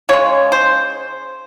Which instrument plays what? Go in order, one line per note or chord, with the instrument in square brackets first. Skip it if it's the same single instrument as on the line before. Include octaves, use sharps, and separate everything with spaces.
[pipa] C#3 G#3 C#5
C5